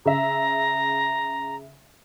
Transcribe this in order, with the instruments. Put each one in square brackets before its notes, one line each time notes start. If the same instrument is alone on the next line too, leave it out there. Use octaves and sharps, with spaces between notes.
[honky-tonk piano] C#3 E5 [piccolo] A#5